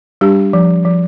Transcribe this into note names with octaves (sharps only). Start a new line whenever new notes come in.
G3 D4 G4
F3
F3